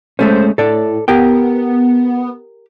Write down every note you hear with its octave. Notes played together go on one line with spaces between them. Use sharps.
G#3 A3 C#4 C5
A2 A4 D5
B3 G4 A#4 G5